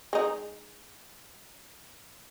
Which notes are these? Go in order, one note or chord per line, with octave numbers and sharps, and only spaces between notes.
G#3 D#4